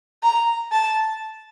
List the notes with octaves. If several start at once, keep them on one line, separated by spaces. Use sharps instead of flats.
A#5
A5